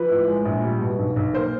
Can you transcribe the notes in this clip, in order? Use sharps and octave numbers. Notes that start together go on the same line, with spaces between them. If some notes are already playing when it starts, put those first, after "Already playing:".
Already playing: F3 B4
A2
G#3
A#1
G3
B2
B1
B1
A#3 C5